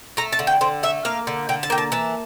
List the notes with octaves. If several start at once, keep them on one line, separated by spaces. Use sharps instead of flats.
A3 A#5
A5
D3
G5
D3 C5
A3 E5
A#3 F5
D3
D3 G5
A5
A#3 G5
A5
E3 A5